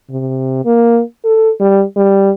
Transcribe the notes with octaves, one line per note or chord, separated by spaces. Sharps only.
C3
A#3
A4
G3
G3